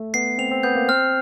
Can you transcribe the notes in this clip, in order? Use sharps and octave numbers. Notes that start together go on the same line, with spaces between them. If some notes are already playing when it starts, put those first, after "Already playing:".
Already playing: A3
B3 C7
C4 F7
C4
B3 G6
A#3
C4 F6